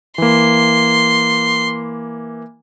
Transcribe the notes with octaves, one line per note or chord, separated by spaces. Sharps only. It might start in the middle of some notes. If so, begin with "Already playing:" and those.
E3 A#3 C6